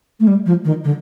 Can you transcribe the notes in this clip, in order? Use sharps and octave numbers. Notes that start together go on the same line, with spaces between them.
A3
G3
F3
D#3
D3